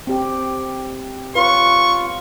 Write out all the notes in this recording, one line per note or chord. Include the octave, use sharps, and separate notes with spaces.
C4 G4
F4 B4 C#5 C#6